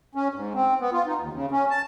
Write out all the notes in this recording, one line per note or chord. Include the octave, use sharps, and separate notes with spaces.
C#4
G#2
C4
B3
F4
D#4
D#2
C#3
C#4
A5